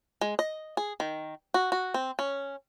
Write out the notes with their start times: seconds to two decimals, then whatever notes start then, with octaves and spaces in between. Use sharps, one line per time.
0.21 G#3
0.39 D#5
0.77 G#4
1.00 D#3
1.54 F#4
1.72 F#4
1.94 C4
2.19 C#4